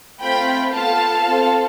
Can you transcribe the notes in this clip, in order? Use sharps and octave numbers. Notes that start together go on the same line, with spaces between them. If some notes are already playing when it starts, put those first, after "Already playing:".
A3 C4 F4 G5 B5
B3 F4 A4 F5 A5
C4 F4 A4